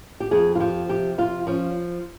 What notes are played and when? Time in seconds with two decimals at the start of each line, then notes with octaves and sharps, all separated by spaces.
0.20 G4
0.31 F2 G#4
0.55 F4
0.60 F3 G4
0.89 C3 G4
1.18 F2 F4
1.47 F3 C#4